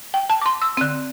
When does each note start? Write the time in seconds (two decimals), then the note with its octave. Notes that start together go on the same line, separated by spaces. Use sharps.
0.14 G5
0.30 A5
0.42 D6
0.46 C6
0.62 E6
0.77 D3 C4